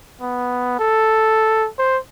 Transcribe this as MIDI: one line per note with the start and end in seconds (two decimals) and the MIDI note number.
0.21 0.77 59
0.79 1.68 69
1.78 1.98 72